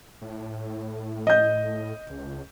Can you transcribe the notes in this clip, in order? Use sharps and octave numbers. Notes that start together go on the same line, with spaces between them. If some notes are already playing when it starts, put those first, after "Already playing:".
A2
D#5 G6
C#2